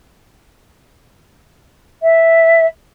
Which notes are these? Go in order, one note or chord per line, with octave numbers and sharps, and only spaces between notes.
E5